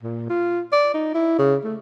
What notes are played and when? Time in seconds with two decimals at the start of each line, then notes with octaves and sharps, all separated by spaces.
0.03 A#2
0.30 F4
0.73 D5
0.94 D#4
1.15 E4
1.39 C#3
1.64 A3